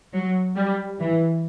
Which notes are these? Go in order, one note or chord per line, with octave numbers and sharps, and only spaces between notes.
F#3
G3
E3